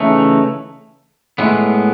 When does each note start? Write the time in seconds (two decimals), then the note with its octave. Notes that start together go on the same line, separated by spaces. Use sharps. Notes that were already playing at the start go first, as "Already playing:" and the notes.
Already playing: C#3 E3 A3 D#4
1.38 A2 G#3 B3